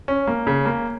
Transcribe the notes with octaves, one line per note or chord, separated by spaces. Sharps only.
C#4
A#3
C#3
A#3